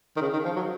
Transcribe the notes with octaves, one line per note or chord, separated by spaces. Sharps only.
D#3
C#3
D#3
F3
F#3